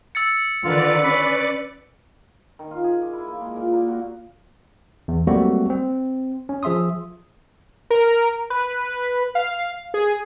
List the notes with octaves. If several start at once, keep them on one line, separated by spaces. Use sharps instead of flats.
E6 A6 C#7
D3 D#3 F4 B4 D5
C#4 B5
D#3
F4
G#4
D6
E4
A#3
G#3
A#2
A#3
F#4
E2
F#3 G3 A3 A#3 C4 F#4
C4
C#4
F3 G#4 E5 C6 D#6
A#4
B4
F5
G#4